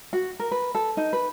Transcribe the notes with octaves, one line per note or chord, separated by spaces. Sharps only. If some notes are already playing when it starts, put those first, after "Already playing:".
F#4
A#4
B4
A4
D#4
B4